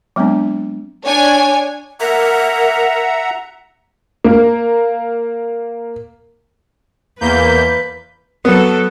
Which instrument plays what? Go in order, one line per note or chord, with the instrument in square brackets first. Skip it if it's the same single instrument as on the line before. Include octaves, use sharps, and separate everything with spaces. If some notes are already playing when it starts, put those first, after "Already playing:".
[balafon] F#3 G#3 B3 C4 D4
[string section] D4 C#5 G#5
[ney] A#4 [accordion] E5 F#5 A#5
[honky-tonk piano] A#3 A#4
[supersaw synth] E2 A#3 G6 [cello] B4
[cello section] F#3 A4 [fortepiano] B3